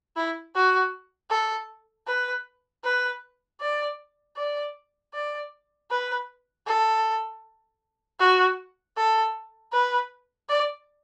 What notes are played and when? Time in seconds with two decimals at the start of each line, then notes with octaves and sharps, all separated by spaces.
0.16 E4
0.55 F#4
1.30 A4
2.07 B4
2.84 B4
3.61 D5
4.36 D5
5.14 D5
5.91 B4
6.66 A4
8.20 F#4
8.97 A4
9.72 B4
10.49 D5